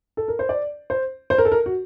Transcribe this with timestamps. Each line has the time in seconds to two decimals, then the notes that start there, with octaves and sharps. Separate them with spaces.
0.17 A4
0.28 A#4
0.39 C5
0.49 D5
0.90 C5
1.30 C5
1.38 A#4
1.45 A4
1.52 A#4
1.66 F#4